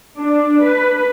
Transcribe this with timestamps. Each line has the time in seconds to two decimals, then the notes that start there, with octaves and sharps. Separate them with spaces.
0.19 D4
0.63 B4